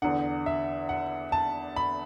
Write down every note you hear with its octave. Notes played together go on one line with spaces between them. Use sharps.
E2 D3 F#5
E5
F#5
A5
B5